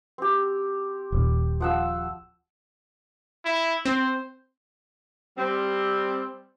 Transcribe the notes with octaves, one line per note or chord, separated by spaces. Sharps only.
C4 G4
D#1
F3 F#5 E6
E4
C4 C5
G3 C4